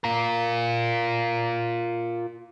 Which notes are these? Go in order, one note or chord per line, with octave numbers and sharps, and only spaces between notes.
F4 A#4